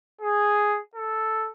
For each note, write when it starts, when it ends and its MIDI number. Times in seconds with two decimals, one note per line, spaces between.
0.21 0.80 68
0.96 1.50 69